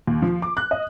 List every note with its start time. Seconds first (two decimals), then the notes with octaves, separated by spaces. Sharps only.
0.07 D#2
0.22 F3
0.42 D6
0.57 F#6
0.71 D#5